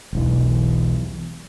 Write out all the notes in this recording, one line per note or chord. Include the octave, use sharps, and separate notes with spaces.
E1 B1 E3